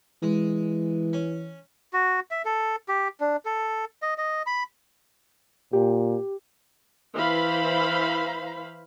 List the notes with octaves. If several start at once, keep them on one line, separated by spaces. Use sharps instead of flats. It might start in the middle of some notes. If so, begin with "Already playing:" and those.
E3 G#3
C#4
F#4
E5
A4
G4
D4
A4
D#5
D#5
B5
A#2 G4
E3 C5 F5 B5